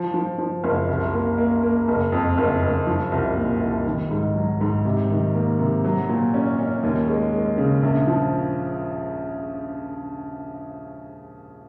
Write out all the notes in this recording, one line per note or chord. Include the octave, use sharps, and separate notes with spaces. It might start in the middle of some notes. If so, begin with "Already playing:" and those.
Already playing: F3
F3
F3
F#1
C2
A#3
A#3
A#3
F#1
F2
F#1
F#1
F3
C2
A#2
C2
D#3
G#2
F#3
G#2
C3
D#3
A#3
C3
F#3
A#2
C#4
C#4
D#2
G#3
G#3
C#3
A#1
F3